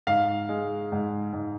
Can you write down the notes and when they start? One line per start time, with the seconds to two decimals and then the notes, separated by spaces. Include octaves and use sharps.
0.07 G#2 F5
0.49 G#3
0.92 G#2
1.33 G#2